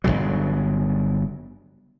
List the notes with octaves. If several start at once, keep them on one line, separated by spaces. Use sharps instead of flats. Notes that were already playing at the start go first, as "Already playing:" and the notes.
G1 D#2 C#3 F#3